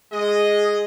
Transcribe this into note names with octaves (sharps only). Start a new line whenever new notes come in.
G#3 G#4 D#5